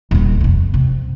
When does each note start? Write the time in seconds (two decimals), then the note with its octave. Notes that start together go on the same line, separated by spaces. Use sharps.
0.11 D#1 D3
0.41 F2 C3
0.74 C3